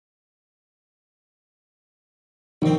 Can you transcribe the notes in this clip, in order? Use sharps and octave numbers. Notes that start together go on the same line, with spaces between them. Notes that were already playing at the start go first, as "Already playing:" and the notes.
A#1 D#3 C4